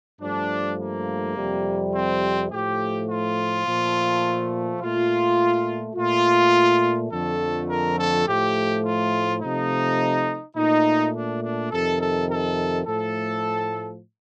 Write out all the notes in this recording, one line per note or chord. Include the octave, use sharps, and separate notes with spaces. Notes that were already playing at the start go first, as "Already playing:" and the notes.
G2 F3 A3 D4
A#3
F2 C3 G3
C4
A2 F3 A3 G4
F4
A#2 F3 A3
A#2 A3 F4
A#2 A3 F4
F2 D3 F3 A3 A4
A#4
A4
A2 F3 A3 G4
F4
C3 F3 A3 D#4
A#2 A3 D#4
D4
D4
F2 C3 D#3 A4
A4
A4
A2 F3 A3 A4